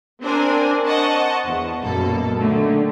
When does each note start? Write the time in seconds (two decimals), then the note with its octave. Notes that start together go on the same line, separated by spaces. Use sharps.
0.23 C4 D4 A#4 C5 G#5
0.87 C5 D#5 F#5 A5 C#6
1.45 E2
1.80 A#1 F#2 B2 A#3 A4
2.37 D3 D#3 A3